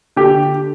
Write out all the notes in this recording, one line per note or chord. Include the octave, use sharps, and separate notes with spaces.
D3 G4